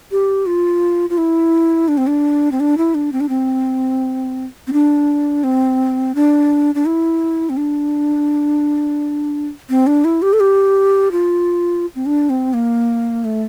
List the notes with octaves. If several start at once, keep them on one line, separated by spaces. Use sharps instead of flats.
G4
F4
F4
E4
D4
C4
D4
C4
D4
E4
D4
C4
D4
C4
C4
D4
C4
D4
D4
E4
C4
D4
C4
D4
E4
G4
A4
G4
F4
C4
D4
C4
A#3
A3